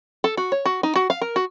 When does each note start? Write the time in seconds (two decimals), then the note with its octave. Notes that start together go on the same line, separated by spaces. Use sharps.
0.24 A4
0.37 F#4
0.52 C#5
0.66 F#4
0.83 D#4
0.96 F#4
1.10 F5
1.22 A#4
1.36 F#4